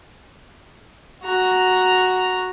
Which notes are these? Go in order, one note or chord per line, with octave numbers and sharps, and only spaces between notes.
F#4 A#5